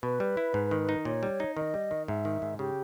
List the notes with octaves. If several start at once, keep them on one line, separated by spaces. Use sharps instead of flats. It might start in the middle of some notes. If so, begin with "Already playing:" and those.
B2 B4
G3
E4
G#2
D#3
D#4
A#2 C#5
G3
D#4
D#3 D#5
G3
D#3
G#2 E5
D#3
G#2
C#3 G4